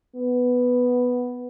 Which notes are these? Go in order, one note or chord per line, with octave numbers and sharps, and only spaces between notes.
B3